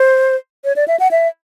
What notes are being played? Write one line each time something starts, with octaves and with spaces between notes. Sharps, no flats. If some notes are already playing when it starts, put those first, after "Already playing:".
Already playing: C5
C#5
D5
E5
F#5
E5